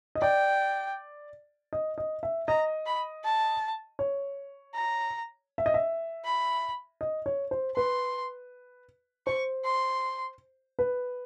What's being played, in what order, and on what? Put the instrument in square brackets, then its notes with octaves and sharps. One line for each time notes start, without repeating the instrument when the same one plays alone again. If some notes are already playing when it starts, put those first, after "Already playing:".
[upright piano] D#5
[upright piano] D5 [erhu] G5
[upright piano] D#5
D#5
E5
[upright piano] D#5 [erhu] A#5
[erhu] B5
A5
[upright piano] C#5
[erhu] A#5
[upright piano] E5
D#5
E5
[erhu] B5
[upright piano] D#5
C#5
C5
[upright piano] B4 [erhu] C6
[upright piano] C5 [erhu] C#6
[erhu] C6
[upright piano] B4